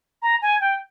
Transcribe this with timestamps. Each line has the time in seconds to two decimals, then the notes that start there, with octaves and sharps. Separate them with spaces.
0.22 A#5
0.42 G#5
0.61 G5